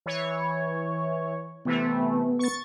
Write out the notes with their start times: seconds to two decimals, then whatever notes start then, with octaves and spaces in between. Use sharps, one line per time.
0.06 E3 C#5
1.65 C3 E3 A3 B3
2.39 C#6 A6